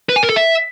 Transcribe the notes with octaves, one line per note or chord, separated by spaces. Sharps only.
B4
G#5
A#4
A4
E5